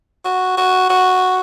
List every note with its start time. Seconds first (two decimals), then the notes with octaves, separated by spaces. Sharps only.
0.25 F#4
0.57 F#4
0.90 F#4